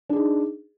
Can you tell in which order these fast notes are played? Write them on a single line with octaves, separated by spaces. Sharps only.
D4 G#4 D#4